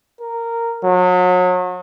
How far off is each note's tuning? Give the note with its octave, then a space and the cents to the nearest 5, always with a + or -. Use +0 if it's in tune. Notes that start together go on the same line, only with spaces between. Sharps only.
A#4 -10
F#3 -35